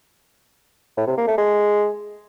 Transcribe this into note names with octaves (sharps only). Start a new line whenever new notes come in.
A2
C3
A#3
A3
G#3